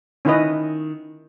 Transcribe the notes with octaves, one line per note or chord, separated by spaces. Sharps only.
D#3 C#4 E4 B4 D#5